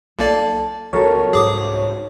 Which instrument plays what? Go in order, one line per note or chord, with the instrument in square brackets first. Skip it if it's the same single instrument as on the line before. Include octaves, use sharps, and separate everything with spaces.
[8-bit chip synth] B1 A#3 D5 [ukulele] A4
[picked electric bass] C#2 F#3 [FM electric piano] F#4 C#5 [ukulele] A4 A#4
[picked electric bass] C2 G#2 [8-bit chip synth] G#4 D6 D#6